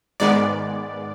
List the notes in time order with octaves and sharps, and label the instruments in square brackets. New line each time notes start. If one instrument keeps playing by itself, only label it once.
[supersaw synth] G#2 D#3 G#3 B3 D5